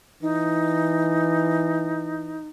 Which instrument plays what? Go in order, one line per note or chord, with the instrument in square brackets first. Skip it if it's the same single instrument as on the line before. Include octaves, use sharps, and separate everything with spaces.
[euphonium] E3 [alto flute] D#4